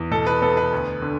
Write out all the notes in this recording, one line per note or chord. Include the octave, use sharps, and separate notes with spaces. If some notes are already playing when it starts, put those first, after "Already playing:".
Already playing: E2
B2 A4
B4
B3 A4
B4
D2
D3